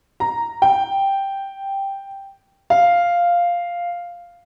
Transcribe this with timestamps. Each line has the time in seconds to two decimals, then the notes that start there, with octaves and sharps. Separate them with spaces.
0.20 A#5
0.62 G5
2.70 F5